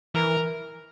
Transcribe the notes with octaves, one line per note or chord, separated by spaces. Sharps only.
E3 A#4